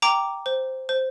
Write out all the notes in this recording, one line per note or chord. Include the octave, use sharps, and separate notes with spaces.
G5 A#5 D6
C5
C5